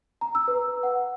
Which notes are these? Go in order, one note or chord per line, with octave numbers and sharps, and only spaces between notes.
A#5
E6
B4
F#5